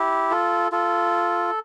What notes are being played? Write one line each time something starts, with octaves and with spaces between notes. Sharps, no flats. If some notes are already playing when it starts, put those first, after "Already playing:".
Already playing: E4 G4
F4 A4
F4 A4